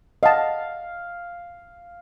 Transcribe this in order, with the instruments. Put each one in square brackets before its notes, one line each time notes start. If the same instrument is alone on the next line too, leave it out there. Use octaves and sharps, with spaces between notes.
[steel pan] D#5 F#5 A5 [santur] F5